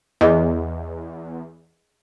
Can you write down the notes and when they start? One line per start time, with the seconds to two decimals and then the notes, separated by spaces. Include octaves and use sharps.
0.21 E2 G#4 D5 D#5